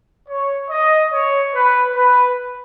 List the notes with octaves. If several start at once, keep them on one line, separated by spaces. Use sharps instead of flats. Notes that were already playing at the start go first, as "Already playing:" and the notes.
C#5
D#5
C#5
B4
B4